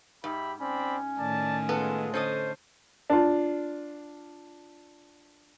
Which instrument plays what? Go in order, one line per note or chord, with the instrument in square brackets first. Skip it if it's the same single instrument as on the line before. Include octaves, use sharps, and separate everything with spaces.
[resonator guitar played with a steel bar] G#2 [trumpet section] G4 E5 B5
[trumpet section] C4 D5 B5 [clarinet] C#4
[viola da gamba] A2 D#3 [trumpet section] D5 A5
[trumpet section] G#3 F4 G#4 [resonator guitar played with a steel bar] B3 A4
[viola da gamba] D3 [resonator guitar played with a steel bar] C#4 A4 D#5 [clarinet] C5
[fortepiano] D4 F4